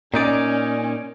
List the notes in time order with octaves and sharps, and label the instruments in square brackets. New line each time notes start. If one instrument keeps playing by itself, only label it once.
[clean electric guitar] A#2 D#4 D5 [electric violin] C#4